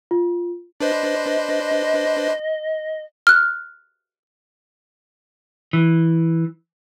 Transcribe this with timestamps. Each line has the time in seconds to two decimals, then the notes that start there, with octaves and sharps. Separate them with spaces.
0.11 F4
0.80 D4 B4 C5 D#5
3.27 F6 F#6
5.73 E3